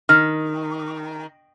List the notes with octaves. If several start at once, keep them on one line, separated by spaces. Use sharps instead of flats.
D#3 F6